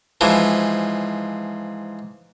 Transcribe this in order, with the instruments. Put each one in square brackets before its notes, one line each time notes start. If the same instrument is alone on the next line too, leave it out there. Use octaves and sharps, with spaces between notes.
[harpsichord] G#2 E3 F3